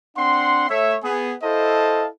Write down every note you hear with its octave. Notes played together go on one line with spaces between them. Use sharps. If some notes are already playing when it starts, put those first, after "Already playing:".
C4 D4 F#5 C6
A3 C#5 E5
B3 G#4
E4 A4 C5 D#5 F5 A5